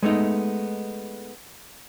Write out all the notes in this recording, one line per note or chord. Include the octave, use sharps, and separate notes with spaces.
G#3 A3 B3 D#4